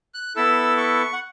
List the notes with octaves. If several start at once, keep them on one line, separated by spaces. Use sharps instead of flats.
F#6
B3 E4 A4 E6
C#6
F#5